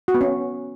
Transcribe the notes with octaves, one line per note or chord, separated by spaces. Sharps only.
F#4
B3
C#4